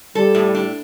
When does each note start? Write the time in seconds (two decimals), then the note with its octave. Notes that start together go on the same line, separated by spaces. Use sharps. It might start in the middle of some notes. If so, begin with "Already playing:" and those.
0.15 G3 A4
0.35 A2
0.55 D4